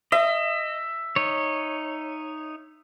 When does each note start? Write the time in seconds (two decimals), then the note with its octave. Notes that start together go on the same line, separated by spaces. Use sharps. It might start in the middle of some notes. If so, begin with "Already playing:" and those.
0.12 D#5 E5
1.16 D#4 C#5